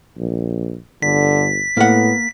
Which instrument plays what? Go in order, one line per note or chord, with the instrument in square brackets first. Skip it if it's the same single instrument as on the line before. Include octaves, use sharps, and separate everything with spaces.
[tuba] A#1
[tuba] G1 [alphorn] D3 [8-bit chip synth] B6
[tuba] A2 [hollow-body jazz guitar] A#3 F#5 [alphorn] B3